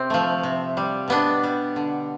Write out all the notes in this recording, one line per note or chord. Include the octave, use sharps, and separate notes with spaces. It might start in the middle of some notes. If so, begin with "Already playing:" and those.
Already playing: C3 C4
F3 A3
C3
G3
B2 B3 D4
G3
D3